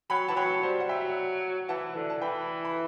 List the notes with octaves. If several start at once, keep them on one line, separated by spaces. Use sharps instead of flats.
F#3 G5 B5
E3 A5
F#3 G5 B5
G3 C5
F#5
F#3 E5 G5
E3 F#5 A5
D3
A5
E3 G5 B5
B5